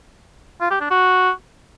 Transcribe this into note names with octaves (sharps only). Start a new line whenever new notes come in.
F4
G4
D4
F#4